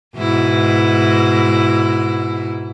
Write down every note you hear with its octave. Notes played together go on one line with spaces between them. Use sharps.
G#2 B2 E4